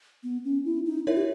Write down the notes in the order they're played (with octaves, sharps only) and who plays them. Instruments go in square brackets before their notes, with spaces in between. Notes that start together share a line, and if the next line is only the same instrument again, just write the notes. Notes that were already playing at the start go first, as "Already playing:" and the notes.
[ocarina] B3
C#4
E4
D#4
[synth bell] D#4 A#4 C#5 E5 [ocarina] E4
[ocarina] G4